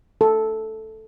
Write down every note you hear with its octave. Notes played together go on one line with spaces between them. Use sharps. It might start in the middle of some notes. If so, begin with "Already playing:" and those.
A4